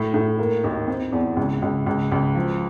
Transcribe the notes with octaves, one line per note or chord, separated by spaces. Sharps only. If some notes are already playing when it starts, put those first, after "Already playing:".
Already playing: A2
A2
A#3
D#2
C4
E2
C#2
C#2
C#2
C#2
F3